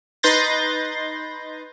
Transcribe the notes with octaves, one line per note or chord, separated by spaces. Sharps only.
D#4 B4 C6 G6 A6 A#6